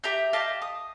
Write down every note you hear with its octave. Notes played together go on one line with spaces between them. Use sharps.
G4 E5 A#5 G6
G4 D#5 F5 A5
D#6